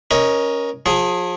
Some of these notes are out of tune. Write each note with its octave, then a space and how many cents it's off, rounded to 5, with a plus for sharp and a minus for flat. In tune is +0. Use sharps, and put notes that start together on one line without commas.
C#4 +0 A#4 +20 D#5 +0
F3 +35 G#4 +0